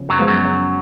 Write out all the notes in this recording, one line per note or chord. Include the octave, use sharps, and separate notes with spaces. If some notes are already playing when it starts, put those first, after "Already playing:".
Already playing: C#3 F3 B3
F#2 F#3
F3 G#3 B3
F#2 F#3
C#3